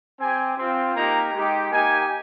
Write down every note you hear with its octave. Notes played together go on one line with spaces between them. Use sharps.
C4 G4 G#5
C4 F4
A#3 D#4 G4 A#5
G#3 D#4 G4
A#3 D#4 G4 G#5